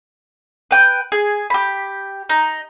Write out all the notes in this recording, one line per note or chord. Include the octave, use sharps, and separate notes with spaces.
B4 G5
G#4
G4 B5
D#4